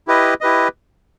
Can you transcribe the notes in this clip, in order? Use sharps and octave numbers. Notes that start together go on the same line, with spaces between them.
E4 G4 B4 D#5
E4 G4 B4 D#5